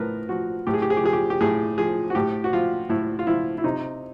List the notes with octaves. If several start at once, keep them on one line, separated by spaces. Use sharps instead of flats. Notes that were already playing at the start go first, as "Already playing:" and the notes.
Already playing: A2 F3 A#4 B4
F3 F#4
A2 G4
G#4
G4
G#4
G4
F3 G#4
G4
G4
A2 G#4
F3 G#4
F#4
A2 G4
F#4
F3 F4
A2 E4
F4
F3 E4
E4
C3 D#4